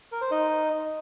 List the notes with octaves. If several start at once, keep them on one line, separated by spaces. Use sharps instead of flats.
A#4
C5
D#4 D#5